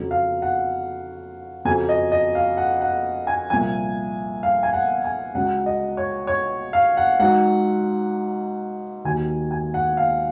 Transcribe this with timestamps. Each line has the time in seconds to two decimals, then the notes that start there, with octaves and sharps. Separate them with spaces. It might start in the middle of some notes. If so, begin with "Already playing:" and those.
Already playing: F2 C#3 F#3
0.11 F5
0.42 F#5
1.65 F2 C#3 F#3 G#5
1.89 D#5
2.12 D#5
2.35 F5
2.57 F#5
2.81 F#5
3.27 G#5
3.50 C2 A#2 F3 G#5
4.43 F5
4.63 G#5
4.73 F#5
5.04 G#5
5.35 C#2 C#3 F#3 F#5
5.66 D#5
5.97 C#5
6.27 C#5
6.73 F5
6.97 F#5
7.20 G#2 F#3 F#5
9.04 D#2 D#3 F#3 G#5
9.51 G#5
9.74 F#5
9.97 F5